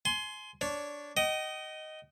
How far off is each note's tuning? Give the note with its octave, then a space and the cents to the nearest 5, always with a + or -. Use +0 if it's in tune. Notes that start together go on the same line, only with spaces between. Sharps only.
G#5 +30 C6 +0
D4 -10 C#5 +0
D#5 +0 G5 -45